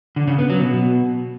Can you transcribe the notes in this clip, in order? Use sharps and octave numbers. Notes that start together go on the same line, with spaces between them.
D3
C#3
B3
F#3
B2